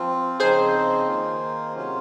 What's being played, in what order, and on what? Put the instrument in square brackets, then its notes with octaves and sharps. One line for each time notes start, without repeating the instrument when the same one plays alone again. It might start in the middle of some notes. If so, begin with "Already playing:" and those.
Already playing: [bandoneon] F3 C4 F4
[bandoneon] C#3 F3 C4 D#4 [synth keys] G#4 C5
[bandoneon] D#3 A#3 F4
C3 F#3 C#4 F4